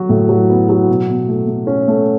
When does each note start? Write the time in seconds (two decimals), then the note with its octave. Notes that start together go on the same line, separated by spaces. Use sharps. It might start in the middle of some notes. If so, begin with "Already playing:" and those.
Already playing: F#3 F#4
0.09 A2
0.29 F#3
0.49 B3
0.69 F#3
0.88 B2
1.09 B2
1.28 A3
1.47 A3
1.67 C#4
1.88 A3